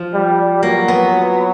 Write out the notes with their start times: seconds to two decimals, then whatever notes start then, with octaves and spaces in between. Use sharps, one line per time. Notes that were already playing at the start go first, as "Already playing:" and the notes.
Already playing: F3
0.14 G3
0.63 F#3 A#3
0.88 B3